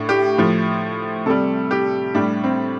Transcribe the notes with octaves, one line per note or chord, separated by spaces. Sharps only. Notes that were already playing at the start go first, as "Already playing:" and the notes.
Already playing: A2 D4
G4
A2 F3
C3 G3 A4
G4
A2 G3 D4
C4